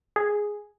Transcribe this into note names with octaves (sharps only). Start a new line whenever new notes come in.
G#4